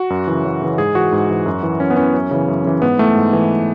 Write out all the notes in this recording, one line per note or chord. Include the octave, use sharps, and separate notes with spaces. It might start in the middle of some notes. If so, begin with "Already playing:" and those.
Already playing: F#4
F#2
C#3 E3
F#2
C#3 E3
G#2 G#4
E3 F#4
G#2
E3
F#2
E3
F#2 C#4
B3
E3 C#4
F#2
C#3 E3
F#2
C#3 E3
G#2 B3
E3 A3
G#2
E3